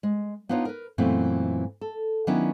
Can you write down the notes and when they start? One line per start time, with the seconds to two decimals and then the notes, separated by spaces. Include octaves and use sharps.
0.03 G#3
0.49 B3 D4 D#4 F4 B4 C#5
0.65 A#4 B4
0.98 F#2 A#2 E3 A3 B3 C4
1.81 A4
2.27 D#3 F#3 B3 C#4 D4 E4